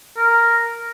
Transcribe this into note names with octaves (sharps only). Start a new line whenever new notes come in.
A#4